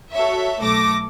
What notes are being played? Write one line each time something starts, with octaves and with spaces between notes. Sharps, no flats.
F#4 A4 C#5 E5
B1 A3 A4 D6 A#6